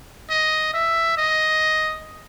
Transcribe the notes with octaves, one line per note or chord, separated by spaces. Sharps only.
D#5
E5
D#5